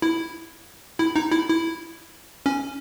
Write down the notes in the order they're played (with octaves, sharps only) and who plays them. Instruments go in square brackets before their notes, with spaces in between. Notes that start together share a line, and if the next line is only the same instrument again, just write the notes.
[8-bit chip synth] E4
E4
D#4
E4
E4
C#4